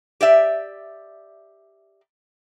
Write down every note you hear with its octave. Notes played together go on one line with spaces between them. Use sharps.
G4 D5 E5